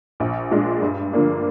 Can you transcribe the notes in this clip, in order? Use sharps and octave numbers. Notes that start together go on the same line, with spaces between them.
A#1
A#2 G#3 D4
G2
D3 F3 A#3 D4